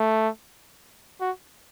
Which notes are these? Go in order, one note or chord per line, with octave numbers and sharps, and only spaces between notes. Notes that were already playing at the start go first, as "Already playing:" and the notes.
Already playing: A3
F#4